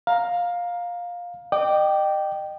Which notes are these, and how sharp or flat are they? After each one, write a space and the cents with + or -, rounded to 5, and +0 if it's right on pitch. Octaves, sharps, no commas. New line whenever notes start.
F5 +15 A#5 +0
D#5 -35 G5 -10 D6 +0